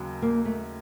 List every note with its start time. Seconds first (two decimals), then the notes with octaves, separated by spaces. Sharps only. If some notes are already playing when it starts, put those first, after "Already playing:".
Already playing: D#2 C#3 F#3
0.22 A#3
0.45 A3